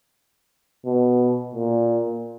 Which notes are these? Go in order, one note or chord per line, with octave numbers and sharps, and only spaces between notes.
B2
A#2